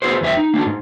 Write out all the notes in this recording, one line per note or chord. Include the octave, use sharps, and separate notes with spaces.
B3 E4 F#4 G#4 C5
E2 F#3 E5 G5
D#4
A#3 D4 F#4
G#2